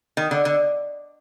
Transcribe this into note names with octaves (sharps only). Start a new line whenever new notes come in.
D#3
D3
D3